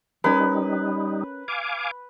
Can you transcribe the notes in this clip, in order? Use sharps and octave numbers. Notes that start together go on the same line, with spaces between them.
G3 C#4 D#4 A#4 B4
F5 G#5 D6